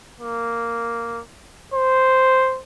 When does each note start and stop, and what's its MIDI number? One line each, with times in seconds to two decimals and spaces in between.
0.21 1.21 58
1.74 2.60 72